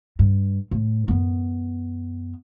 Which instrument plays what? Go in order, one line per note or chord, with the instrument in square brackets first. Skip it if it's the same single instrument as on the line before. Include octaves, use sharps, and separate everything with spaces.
[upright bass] G2
A2
F#2 B3